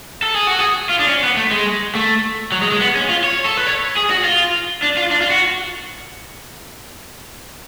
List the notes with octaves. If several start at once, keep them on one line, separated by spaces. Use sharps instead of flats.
A4
G#4
F#4
G#4
F4
D4
C#4
B3
A3
G#3
A3
F#3
G#3
G#3
B3
C#4
F4
C#5
A4
B4
C#5
G#4
F#4
F4
D4
F4
D4
F4
F#4